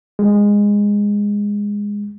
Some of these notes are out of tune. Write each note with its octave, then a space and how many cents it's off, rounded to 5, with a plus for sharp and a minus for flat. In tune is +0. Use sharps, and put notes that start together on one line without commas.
G#3 -15